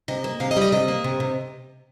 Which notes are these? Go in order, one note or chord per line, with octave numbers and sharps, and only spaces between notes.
C3 D#5
A#3
C3 F5
D#5
G3
D#5
C3 D#5
A#3
C3
C3